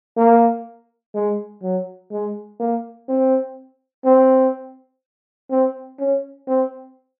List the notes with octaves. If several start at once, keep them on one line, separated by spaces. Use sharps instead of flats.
A#3
G#3
F#3
G#3
A#3
C4
C4
C4
C#4
C4